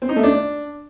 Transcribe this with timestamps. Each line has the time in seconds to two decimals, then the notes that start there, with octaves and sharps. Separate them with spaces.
0.02 C4
0.09 D#4
0.16 A3
0.23 D4